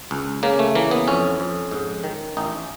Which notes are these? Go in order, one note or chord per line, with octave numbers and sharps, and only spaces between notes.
C#2
C#3 A#3
A3
E3 A#3
B3
F2 C#4
F2
G#2
D#3
A1 D#4